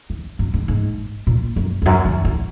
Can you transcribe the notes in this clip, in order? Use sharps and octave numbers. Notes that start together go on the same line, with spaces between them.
E3
F#2
G#2
G#2
A#2
F#2
E2
F#2
D#3
E3